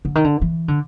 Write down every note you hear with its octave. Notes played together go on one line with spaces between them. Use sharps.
D3
D#3
D3
E3
D3